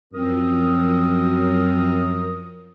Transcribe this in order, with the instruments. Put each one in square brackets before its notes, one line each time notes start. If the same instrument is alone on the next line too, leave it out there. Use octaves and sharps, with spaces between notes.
[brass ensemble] F#2 [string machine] F3 [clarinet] C4 [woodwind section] A#4 D#6